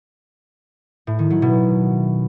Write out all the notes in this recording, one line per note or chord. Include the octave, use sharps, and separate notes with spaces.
A2
D#3
F#3
B2